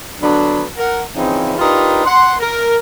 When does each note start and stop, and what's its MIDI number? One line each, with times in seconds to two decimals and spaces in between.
0.21 0.64 50
0.21 0.64 54
0.21 0.64 59
0.21 0.64 62
0.77 1.01 70
0.77 1.01 78
1.15 1.53 49
1.15 1.53 52
1.15 1.53 53
1.15 1.53 60
1.15 1.53 61
1.15 1.53 63
1.58 2.03 62
1.58 2.03 63
1.58 2.03 65
1.58 2.03 67
1.58 2.03 70
1.58 2.03 71
2.05 2.33 78
2.05 2.33 84
2.40 2.76 70